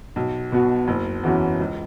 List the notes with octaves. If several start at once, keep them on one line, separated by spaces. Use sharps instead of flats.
B1
B2 B3 F#4
F#1
E2 E3 C#4 F#4
C#2